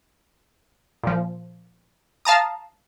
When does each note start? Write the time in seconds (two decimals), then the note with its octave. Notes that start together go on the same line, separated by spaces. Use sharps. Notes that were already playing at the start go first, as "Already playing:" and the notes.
1.03 A#2 F3
2.25 F5 A5 A#5 D#6